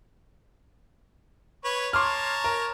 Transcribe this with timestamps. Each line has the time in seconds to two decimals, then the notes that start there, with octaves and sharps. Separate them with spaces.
1.64 B4 C#5 C#6
1.93 C#5 A5 A#5 C6 D6 F6
2.44 A#4